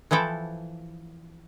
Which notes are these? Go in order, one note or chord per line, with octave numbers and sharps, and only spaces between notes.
E3 F3 E4 A4 G5